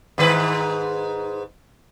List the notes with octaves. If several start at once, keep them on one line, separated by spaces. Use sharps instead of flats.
G#2 D#3 B4